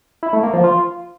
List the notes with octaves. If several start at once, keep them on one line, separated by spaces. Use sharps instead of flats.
E4
A3
A#3
F3
F4